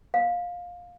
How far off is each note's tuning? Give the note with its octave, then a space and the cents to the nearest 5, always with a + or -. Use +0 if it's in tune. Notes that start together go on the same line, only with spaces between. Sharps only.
F5 +15